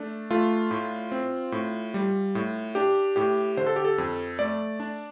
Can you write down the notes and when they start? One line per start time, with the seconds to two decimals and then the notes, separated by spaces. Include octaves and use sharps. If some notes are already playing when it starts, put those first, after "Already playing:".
Already playing: A3 D4
0.31 A3 F4
0.71 A2
1.12 C4
1.52 A2
1.94 G3
2.35 A2
2.75 D4 G4
3.16 A2 G4
3.57 D3 C5
3.66 A4
3.76 G4
3.85 A4
3.98 F2
4.39 A3 D5
4.80 D4